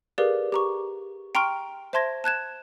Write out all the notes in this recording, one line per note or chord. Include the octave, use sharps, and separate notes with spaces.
G4 G#4 A#4 B4 D5 F5
G4 A#5 C#6
G5 A#5 C6 C#6 F6 D7
C5 E5 A5 C6 G#6 A#6
A5 F#6 G#6 E7